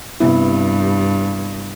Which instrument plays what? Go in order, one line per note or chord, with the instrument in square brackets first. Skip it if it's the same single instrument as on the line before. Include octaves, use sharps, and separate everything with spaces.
[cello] G2 [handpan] C3 B3 E4